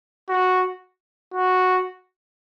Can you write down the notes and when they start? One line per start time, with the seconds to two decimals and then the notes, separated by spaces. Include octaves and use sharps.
0.29 F#4
1.34 F#4